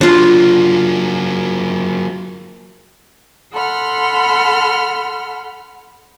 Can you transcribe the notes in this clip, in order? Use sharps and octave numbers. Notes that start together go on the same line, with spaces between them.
F#3 A#3 D4 F4
A4 F#5 B5 C6 F6